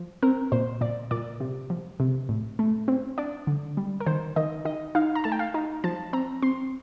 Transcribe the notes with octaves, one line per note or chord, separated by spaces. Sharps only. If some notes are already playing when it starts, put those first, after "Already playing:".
Already playing: F3
C4 A#4
A#2 C5
A#2 D5
A#2 D5
C3
F3
C3
A2
A3
C4
D4 D5
D3
G3
A#4
D#3 C5
D#3 D#5
D#3 D#5
D#4 F5
A#5
A3 A5
G5
F5
D#4
F3 A5
C4 A#5
C4 C6